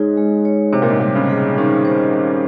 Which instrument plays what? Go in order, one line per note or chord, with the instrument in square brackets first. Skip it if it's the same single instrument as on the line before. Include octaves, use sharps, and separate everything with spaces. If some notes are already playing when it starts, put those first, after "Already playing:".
Already playing: [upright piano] G#2 [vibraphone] G#3 D#4 G#4 C#5
[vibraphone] G#3
C#5
[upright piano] C3 [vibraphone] C5
[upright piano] A#2
G#2
[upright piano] A#2 [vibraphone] G3
[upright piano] C#3
[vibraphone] G#4
[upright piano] D#3 [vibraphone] C#4
[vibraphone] C5
C5